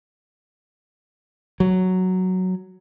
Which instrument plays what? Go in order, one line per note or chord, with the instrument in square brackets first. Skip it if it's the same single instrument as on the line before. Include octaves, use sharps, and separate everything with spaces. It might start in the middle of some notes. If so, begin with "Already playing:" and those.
[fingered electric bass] F#3